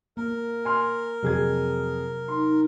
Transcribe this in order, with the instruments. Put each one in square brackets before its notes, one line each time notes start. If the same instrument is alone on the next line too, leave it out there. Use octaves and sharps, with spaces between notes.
[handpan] A#3 [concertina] A#4
[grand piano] G#5 C6 F6
[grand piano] F2 G#4 G#6 [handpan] C3 F#3 F#4
[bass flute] D#4 [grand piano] C6